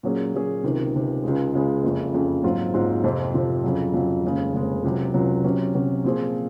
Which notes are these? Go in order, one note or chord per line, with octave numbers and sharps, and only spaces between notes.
A#2 F#3 C#4 G#4
A#2 F#3 C#4 G#4
C#2 C3 D#3
C#2 C3 D#3
C#2 C#3 G#3
C#2 C#3 G#3
F#1 F2 C#3
F#1 F2 C#3
A#1 G#2 F#3 C4 F4
A#1 G#2 F#3 C4 F4
F2 C3 F3 C4
F2 C3 F3 C4
F2 C#3 F#3
F2 C#3 F#3
F1 D#2 C#3 G#3
F1 D#2 C#3 G#3
C#2 C3 F#3
C#2 C3 F#3
C3 F#3 C#4
C3 F#3 C#4
A#2 F3 C4 F4 G#4